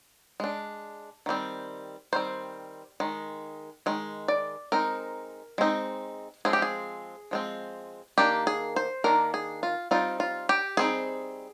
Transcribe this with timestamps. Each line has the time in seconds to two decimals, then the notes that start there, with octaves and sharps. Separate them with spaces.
0.40 G#3 D4
1.26 D#3 G3 C4
2.13 D#3 G3 C4 C5
3.00 D#3 G#3
3.86 D#3 G#3
4.28 D5
4.72 G#3 C4 D#4 A#4
5.58 G#3 C4 D#4
6.45 F3 G#3 C4 G#4
6.53 G4
6.62 G#4
7.31 F3 G#3 C4
8.18 D#3 A#3 D4 G4
8.47 G#4
8.76 C5
9.04 D#3 A#3 D4 A#4
9.34 G#4
9.63 F4
9.91 G3 C4 D#4 F4
10.20 F4
10.49 G4
10.77 G3 C4 D#4 G#4